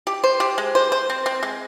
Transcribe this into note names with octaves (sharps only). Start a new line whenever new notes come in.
G4
C5
G4
G#3
C5
C5
C4
C4
G#3